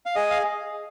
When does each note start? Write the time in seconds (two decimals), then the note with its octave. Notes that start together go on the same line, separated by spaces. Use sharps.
0.06 F5
0.16 G#4 D#5
0.31 F5